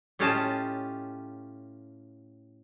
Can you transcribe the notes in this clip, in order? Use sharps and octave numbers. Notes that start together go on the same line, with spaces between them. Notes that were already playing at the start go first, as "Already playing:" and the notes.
A2 C#4 F4 G4 D#5 A5